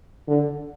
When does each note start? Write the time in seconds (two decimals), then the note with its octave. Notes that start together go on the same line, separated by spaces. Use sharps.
0.28 D3